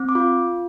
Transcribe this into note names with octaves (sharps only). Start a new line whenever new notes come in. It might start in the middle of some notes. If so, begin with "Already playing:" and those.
Already playing: C4
D6
F4